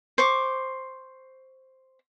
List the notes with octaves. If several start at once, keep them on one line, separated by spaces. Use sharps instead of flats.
C5 C#6 D6